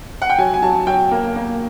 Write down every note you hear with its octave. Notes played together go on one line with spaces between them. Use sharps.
F#5
G5
F#3 G#5
G#5
F#3 A5
F#3 G5
A#3
A#3